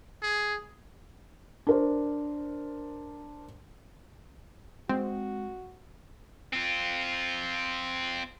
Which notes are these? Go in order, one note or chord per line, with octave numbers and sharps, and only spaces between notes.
G#4
D4 A#4 C5
G#3 C4 F#4
C4 F4